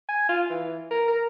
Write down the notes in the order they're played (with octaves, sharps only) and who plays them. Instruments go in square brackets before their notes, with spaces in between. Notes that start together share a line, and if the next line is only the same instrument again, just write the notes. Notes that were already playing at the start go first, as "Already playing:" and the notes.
[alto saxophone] G#5
F4
E3
A#4
A#4